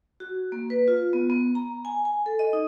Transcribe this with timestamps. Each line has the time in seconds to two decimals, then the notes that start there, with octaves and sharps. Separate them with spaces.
0.20 F#4
0.52 A#3
0.70 B4
0.88 F4
1.13 B3
1.30 B3
1.55 A#5
1.85 G#5
2.05 G#5
2.26 A4
2.39 D#5
2.53 D#4